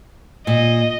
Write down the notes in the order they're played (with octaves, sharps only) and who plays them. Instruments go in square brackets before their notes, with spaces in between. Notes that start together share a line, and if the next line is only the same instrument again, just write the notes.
[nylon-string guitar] A#2 [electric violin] D#5